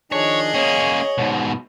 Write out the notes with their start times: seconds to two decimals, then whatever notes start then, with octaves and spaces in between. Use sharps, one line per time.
0.12 D#3 F3 D4 G#4 C#5 D#5
0.54 A#3 C#4 C#5
1.18 G#2 B2